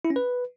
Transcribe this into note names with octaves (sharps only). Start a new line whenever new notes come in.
E4
C#4
B4